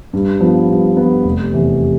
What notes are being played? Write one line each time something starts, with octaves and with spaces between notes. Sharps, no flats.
G2
F3 B3
G2
F3 B3
F1
E2 C3